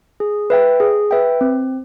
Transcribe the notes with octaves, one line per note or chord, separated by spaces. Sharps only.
G#4
B4 E5 G5
G#4
B4 E5 G5
C4